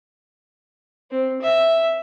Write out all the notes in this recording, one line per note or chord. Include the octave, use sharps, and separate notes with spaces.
C4
E5